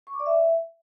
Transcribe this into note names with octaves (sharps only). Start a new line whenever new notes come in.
C#6
D6
D5
E5